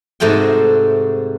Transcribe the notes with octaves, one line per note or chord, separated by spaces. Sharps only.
G#2 C3 A3 F#4 G5